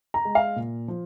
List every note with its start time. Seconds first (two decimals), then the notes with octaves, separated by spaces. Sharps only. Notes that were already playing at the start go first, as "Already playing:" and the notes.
0.14 A#5
0.25 G#3
0.35 F5
0.56 A#2
0.88 F3